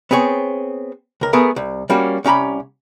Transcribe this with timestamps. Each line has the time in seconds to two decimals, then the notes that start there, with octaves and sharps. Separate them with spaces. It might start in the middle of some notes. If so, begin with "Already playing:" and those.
0.11 B3 C4 G#4 C#5
1.21 C#2 A#4
1.33 A3 B3 G#4 A#4
1.56 C2
1.90 G3 A#3 C#4 F#4
2.24 C2 C#4 G4 A#5 B5